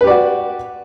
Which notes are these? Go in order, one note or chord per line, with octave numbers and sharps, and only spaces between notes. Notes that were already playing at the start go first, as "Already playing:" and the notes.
F#4 G4 B4 D5